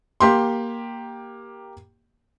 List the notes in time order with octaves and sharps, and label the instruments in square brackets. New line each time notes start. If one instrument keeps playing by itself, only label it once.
[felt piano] A#3 G4 C6